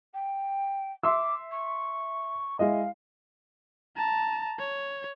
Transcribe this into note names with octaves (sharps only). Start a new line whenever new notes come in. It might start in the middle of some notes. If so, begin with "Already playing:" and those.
G5
E5 C6 D6 E6
C#6
G#3 E4 D#5 F5
A5 A#5
C#5